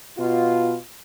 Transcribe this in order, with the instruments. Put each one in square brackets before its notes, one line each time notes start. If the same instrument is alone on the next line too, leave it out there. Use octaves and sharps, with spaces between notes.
[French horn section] B2 F4